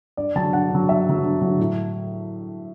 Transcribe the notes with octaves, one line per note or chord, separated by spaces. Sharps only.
G2 D5
D3 F#3 A5
G2 F#5
D3 F#3
G2 E5
D3 F#3
G2
D3 F#3
A2